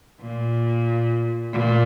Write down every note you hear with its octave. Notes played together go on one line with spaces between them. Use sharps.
A#2
A#2